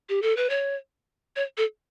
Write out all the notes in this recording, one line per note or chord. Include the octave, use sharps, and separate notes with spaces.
G4
A4
B4
C#5
C#5
A4